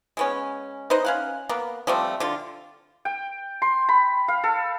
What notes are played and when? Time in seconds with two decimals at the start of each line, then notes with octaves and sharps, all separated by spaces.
0.17 G#3 B3 C#4
0.90 D#4 B4 C5 D#5
1.05 C#4 F5 F#5
1.49 A#3 B3
1.87 F3 G3 A3 C4
2.20 D3 F4
3.05 G5
3.62 C6
3.89 B5
4.28 F5
4.44 A4